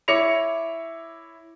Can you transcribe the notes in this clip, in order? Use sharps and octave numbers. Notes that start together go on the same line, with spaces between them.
E4 C#5 D6 A#6 C#7 F7